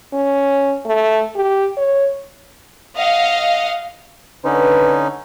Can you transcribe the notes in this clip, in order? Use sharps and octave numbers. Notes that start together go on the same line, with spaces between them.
C#4
A3
G4
C#5
D#5 F5 F#5
D3 C#4 D#4 B4